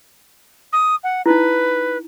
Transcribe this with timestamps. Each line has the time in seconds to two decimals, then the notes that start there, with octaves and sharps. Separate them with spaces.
0.73 D#6
1.04 F#5
1.26 D#4 E4 B4